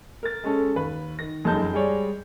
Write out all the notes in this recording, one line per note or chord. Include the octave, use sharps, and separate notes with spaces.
A#4 A6
G#3 C#4 A4
D#2 B4 B5
D#3 A#6
F1 F#2 G#3 D#4 A5 G6
G3 G#3 G#4 C#5 D5